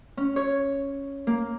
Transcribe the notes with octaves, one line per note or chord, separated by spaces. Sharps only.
C#4
C#5
A#3